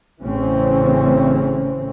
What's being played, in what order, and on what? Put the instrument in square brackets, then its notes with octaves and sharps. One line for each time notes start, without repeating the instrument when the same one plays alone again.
[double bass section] A1 A2 C#3 E3 C4 C#4